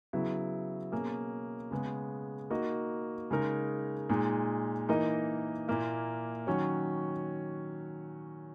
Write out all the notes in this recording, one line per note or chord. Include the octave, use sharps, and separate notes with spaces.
C#3 F#3 B3 E4
B2 A#3 C#4 G#4
C#3 G#3 B3
A#3 D#4 F#4 A#4 D#5
C#3 G#3 D#4 A#4
A#2 G#3 D#4
E3 A#3 D#4 A#4 D#5
A#2 A#3 E4
D#3 F#3 C#4 F#4 C#5